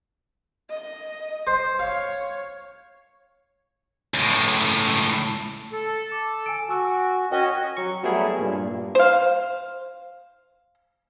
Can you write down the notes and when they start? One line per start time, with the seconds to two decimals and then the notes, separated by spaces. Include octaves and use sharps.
0.69 D#5
1.47 C5
1.79 C#5 F5
4.14 C#2 A2
5.72 A4
6.12 D6
6.46 G#5 E6 D7
6.69 F#4 G#5 E6
7.32 C#4 F#4 A#4 C#5 D#5 G5
7.77 F#3 C#6
8.03 F#3 G3 A3 B3 E4 G#4
8.39 G2 A#2
8.95 C5 F5